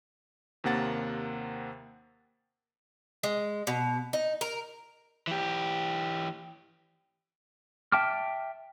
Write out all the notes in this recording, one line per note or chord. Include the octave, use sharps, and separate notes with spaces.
D#2 C3 A#3 F#5 A6
G#3
B2
D#4
A#4
E3 G4
E5 G5 A5 D6 F6